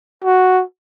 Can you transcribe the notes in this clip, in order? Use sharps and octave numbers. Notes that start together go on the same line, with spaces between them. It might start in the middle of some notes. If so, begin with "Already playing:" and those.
F#4